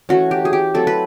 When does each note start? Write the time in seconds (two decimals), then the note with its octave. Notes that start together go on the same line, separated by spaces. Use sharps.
0.09 E3 A3 C#4 F#4
0.31 G4
0.45 G#4
0.53 G4
0.74 F#3 A3 C4 E4 A4
0.87 B4